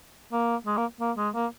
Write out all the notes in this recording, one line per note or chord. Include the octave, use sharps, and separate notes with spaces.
A#3
G#3
A#3
A#3
G#3
A#3